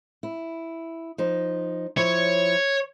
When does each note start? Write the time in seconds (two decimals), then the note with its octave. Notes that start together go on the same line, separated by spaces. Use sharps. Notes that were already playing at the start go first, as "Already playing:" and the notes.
0.23 E4
1.18 F3 D#4
1.97 F3 E4 C#5